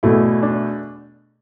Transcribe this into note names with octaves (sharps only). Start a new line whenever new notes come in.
E2 B2 A3 E4
D4